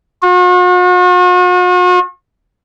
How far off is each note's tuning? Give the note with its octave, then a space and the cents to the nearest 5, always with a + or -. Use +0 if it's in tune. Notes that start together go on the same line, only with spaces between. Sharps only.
F#4 -45